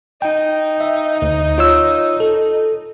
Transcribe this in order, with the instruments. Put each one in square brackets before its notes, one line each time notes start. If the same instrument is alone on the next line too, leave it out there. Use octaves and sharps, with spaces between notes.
[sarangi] D#4 [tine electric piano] G5
[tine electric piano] E5
D2
F4 C#5 E6
A4